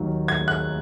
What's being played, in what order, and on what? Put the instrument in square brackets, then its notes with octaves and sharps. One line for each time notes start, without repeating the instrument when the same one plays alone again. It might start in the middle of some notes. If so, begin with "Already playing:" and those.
Already playing: [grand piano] D#2 D#3 F#3
G#6
F#6